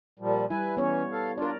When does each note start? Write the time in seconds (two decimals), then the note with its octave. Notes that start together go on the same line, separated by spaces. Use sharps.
0.19 A#2 F3 G3
0.50 G3 E4 B4 E5 G#5
0.77 E3 B3 C#4 C#5
1.12 A4 F5
1.38 D4 F4 A#4 D5